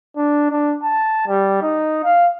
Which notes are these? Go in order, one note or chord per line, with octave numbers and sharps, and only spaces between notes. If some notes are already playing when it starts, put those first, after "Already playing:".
D4
D4
A5
G3
D#4
F5